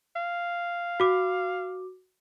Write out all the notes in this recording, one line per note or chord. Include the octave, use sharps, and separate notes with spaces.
F5
F#4 D6